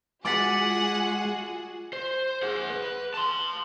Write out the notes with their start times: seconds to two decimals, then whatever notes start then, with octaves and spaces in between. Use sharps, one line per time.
0.25 G#3 F4 F#4 G#4 F#5 D6 A6 B6
1.93 C5
2.43 G#4 F#5
2.70 B4
3.14 A5 C6